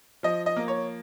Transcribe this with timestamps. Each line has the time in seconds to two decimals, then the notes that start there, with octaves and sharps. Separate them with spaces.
0.23 F3 D#5
0.46 D#5
0.56 A#3
0.68 C#5